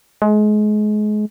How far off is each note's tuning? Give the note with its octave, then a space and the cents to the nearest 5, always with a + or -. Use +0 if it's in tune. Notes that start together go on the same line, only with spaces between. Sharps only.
G#3 +30